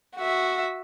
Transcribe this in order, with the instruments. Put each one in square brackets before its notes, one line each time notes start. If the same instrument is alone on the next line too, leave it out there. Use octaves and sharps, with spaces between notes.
[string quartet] F#4 E5